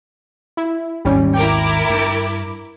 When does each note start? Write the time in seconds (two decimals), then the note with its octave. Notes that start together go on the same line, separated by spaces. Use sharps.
0.57 E4
1.05 G#1 D#2 G3 C#4
1.34 E4 A#4 G5 D6
1.90 G2